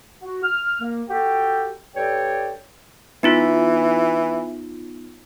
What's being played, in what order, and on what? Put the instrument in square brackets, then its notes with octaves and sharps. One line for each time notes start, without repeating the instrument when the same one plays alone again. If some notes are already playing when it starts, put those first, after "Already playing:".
[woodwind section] F#4
F6
A#3
F#4 G4 A4 G5
G2 A4 C#5 D5 G5
[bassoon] E3 [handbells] B3 D#4 F4